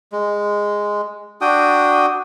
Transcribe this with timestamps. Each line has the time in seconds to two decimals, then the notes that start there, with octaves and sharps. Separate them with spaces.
0.12 G#3
1.41 D4 F#4 G5 D#6